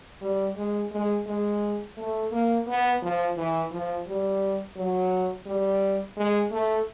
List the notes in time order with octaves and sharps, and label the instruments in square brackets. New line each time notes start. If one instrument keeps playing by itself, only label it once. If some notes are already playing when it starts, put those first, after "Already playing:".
[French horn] G3
G#3
G#3
G#3
A3
A#3
B3
F3
E3
F3
G3
F#3
G3
G#3
A3